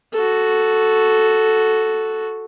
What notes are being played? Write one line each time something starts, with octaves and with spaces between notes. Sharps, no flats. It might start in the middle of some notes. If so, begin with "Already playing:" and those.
F#4 A4